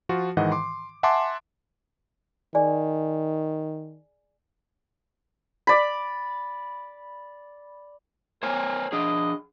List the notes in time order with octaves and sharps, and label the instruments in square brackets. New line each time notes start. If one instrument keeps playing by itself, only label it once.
[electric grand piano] F3 F4 F#4
G#2 D#3 E3 D#5 F#5
C6 D6
E5 F#5 G#5 A5 C6 D6
[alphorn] D#3 [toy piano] G#4 D5 G#5
[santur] D5 B5
[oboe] A#4 [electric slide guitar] C5 C#5 G#5
[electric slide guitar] D4 G#4 [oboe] D#5